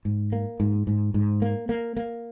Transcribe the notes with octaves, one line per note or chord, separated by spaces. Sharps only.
G#2
A#3
G#2
G#2
G#2
A#3
A#3
A#3